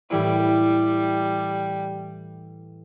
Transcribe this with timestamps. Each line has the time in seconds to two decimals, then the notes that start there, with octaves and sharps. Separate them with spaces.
0.10 A2 E3 G3 E4